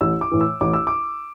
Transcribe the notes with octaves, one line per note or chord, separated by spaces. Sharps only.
A1 E6
D6
A2 E3
E6
A1 D6
E6
D6